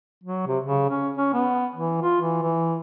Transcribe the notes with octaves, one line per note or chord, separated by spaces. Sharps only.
F#3
C3
C#3
C#4
C#4
B3
E3
F4
E3
E3